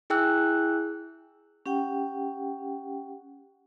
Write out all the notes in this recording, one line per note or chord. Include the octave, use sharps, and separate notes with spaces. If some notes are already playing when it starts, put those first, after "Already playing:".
E4 G#4 G5 E6 F#6
C#4 G4 F#5 G5